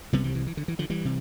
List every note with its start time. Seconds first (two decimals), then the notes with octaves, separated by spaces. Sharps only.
0.13 C2 C3 G3 B3
0.24 E3 G3
0.35 E3
0.47 E3
0.57 D3
0.68 E3
0.79 D3 F3
0.90 E3 G3
1.05 C3